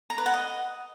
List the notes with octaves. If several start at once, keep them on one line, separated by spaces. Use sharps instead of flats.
A#5
B4
F#5
D#5